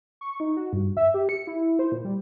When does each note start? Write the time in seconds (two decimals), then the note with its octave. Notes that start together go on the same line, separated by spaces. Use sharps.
0.21 C#6
0.40 D#4
0.57 F#4
0.73 G2
0.97 E5
1.14 G4
1.29 C#7
1.47 E4
1.79 C5
1.92 A#2
2.05 G3